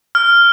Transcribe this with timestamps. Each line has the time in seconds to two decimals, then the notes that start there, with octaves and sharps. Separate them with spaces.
0.15 F6